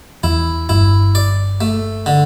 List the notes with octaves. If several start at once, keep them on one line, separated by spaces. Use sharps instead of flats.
E2 E3 E4
G1 G2 E4
D5
A3
D3